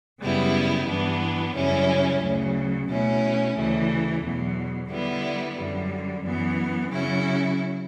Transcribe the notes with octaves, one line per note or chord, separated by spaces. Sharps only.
F#2 C#3 G3 B3 E4
G2 E3 B3 D4
F#2 C#3 G3 C#4 E4
D2 C#3 F#3
B2 A3 C#4 E4
D2 C#3 E3 A3
E2 B2 F#3
D3 G3 B3 E4
F#2 D3 G3
F#2 E3 B3
C#3 F#3 C#4 E4